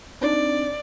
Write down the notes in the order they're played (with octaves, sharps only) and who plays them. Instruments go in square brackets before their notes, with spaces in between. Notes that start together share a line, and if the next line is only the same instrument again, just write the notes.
[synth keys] C4 D4 D#4 [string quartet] D5